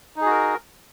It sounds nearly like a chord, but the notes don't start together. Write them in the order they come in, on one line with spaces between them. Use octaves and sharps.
D#4 G#4 F#4 A#4